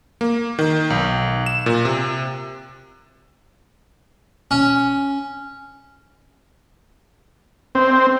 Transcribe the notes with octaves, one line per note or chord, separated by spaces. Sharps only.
A#3
D#3
B1
E7
A#2
C3
C#4
C4